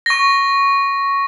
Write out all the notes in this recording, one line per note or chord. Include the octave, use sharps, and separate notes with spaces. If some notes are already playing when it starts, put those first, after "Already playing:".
C#6 A#6